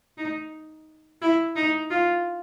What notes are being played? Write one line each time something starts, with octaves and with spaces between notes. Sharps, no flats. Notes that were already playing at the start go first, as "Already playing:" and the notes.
D#4
E4
D#4
F4